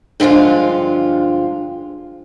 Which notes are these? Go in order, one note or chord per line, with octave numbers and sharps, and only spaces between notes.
G2 D3 F3 G#3 F4